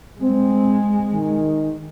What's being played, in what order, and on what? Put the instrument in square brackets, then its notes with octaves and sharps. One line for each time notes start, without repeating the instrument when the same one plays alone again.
[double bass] G#3 [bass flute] C4
[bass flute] D#3